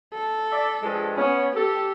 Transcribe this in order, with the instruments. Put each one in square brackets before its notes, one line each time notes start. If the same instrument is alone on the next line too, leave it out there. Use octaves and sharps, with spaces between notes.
[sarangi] A4
[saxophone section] D5 E5
G2 F3 G#3
[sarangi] B3 [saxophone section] C#4
[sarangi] G4 [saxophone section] A4